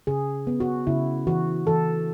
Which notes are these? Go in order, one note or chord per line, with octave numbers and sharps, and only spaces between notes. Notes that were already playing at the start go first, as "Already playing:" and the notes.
C#3 G#4
B3
F#4
C#3 E4
E3 F#4
E3 A4